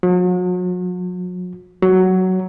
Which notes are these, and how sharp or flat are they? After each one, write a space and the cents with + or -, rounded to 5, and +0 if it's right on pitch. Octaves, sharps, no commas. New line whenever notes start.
F#3 -40
F#3 +10